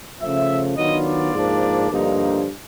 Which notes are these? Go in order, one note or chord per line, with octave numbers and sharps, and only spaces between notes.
C#3 F3 A3 E5
D#3 F#3 B3 D4 F4 D#5
D5
G#2 F3 A#3 D4
G2 D3 F3 A#3 D#4